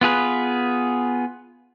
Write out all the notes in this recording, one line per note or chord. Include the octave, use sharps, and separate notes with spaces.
B3 F4 G#4 B4